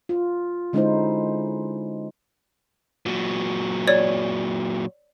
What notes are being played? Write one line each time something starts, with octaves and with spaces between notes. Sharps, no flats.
F4
D3 G#3 C#4 D#4 E4 C5
A#2 F#3
C#5 D5